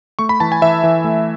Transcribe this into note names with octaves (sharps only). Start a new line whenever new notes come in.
A3 C#6
B5
E3 A5
G#5
E3 E5
E3
A3